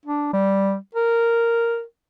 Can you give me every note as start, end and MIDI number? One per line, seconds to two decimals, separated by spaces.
0.05 0.32 62
0.33 0.76 55
0.95 1.83 70